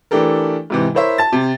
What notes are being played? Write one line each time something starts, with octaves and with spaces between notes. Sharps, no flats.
E3 A3 D4 G4 A4 A#4
G#2 C3 E3
E4 A#4 C5 C#5 E5
A5 A6
C3